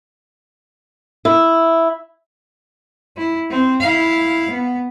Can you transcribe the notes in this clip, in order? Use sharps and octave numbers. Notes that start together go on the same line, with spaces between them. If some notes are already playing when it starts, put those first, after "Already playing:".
E4
E4
C4
E4 F5
B3